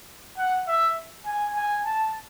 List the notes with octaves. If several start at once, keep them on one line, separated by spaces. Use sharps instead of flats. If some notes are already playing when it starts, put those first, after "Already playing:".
F#5
E5
G#5
G#5
A5